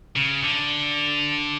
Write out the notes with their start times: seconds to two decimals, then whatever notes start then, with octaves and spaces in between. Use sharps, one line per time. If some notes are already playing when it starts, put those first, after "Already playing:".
0.16 C#3
0.43 D3